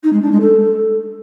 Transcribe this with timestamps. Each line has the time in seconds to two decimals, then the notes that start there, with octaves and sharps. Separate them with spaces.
0.03 D#4
0.13 G#3
0.22 D4
0.31 G#3
0.41 A4